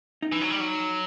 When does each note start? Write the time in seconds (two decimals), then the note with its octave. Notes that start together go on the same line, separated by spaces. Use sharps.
0.22 D#4
0.32 E3
0.41 F#3
0.51 G3
0.61 F#3